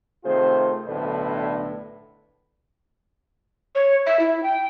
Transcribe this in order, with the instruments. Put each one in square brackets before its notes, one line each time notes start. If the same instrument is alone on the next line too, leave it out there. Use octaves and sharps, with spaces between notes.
[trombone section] C3 D#3 A3 F4 G#4 C5
B1 A2 D3 D4 A4 B4
[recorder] C#5
E5
E4
G5